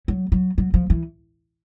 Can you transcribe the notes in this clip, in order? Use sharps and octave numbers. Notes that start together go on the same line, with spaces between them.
F#3
F#3
F#3
F3
E3